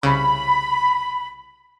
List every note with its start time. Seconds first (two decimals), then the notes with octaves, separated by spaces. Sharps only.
0.03 C2 C#3 B5